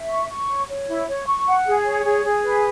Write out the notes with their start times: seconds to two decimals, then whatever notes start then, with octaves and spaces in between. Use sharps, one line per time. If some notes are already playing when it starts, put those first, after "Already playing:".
Already playing: E5
0.09 C#6
0.29 C#6
0.49 C#5
0.68 C#5
0.88 E4
1.07 C#5
1.26 C#6
1.46 F#5
1.66 G#4
1.85 C#5
2.05 G#4
2.25 G#4
2.44 B4